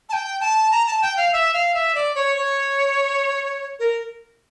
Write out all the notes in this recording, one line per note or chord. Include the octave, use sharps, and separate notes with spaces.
A5
G5
A5
A#5
A5
G5
F5
E5
F5
E5
D5
C#5
C#5
A#4